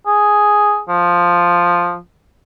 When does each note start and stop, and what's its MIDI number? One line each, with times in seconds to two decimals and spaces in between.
0.06 0.79 68
0.89 1.97 53